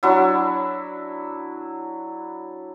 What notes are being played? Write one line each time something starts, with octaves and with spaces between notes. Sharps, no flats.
F#3 D4 E4